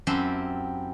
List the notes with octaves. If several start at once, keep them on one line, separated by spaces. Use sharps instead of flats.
F#2 C4 E4 G4 A5 C6